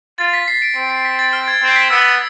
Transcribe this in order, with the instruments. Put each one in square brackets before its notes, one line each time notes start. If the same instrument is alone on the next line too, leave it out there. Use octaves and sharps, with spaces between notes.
[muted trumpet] F4 [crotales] A6
[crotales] B6
C7
D7
[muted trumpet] C4 [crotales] D7
[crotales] C7
B6
A6
F6
G#6
[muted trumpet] C4
[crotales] B6
[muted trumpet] B3 [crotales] E6